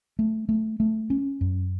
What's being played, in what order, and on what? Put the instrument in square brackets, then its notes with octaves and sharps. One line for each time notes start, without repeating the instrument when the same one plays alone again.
[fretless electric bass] A3
A3
A3
C#4
F#2